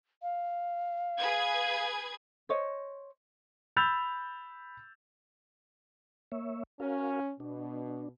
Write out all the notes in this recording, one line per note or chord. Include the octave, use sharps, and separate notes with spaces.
F5
G#4 B4 G#6
C5 C#5 D#5
B5 E6 G6 A6 F7
A#3 C#5 E5
C#4 F#4 A#4 F5
B2 D4